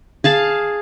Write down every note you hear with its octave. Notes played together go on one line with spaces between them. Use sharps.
G#4 F5 A5